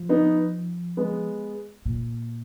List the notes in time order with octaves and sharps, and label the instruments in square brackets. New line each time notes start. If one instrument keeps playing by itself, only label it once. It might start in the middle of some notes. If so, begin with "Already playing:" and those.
Already playing: [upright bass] F3
[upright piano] B3 D#4
G#3 B3
[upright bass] A#2